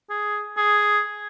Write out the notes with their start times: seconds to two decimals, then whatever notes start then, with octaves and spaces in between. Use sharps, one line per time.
0.10 G#4
0.57 G#4